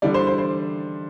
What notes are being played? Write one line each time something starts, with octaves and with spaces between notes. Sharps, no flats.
D3 G3 D5
C5
C5
C5